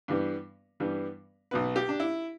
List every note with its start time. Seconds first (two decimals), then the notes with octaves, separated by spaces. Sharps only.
0.08 G2 E3 G3 B3
0.80 G2 E3 G3 B3
1.51 B1 B2 B3 B4
1.76 G4
1.89 D4
2.00 E4